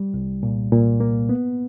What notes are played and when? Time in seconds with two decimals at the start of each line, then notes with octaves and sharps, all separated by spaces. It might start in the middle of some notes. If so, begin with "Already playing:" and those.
Already playing: G3
0.14 C2
0.43 A#2
0.72 A#2
1.00 A#3
1.29 B3